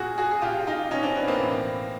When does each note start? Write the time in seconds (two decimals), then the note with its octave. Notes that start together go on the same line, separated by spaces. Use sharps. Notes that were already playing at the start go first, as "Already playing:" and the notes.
Already playing: A#2 F#4 G#4
0.18 F#4 G#4
0.31 G#4
0.42 A#2 F4 G4
0.67 D#4 F4
0.91 B2 C#4 D#4
1.03 C4 D4
1.16 B3
1.27 A#3 C4
1.40 A2 E3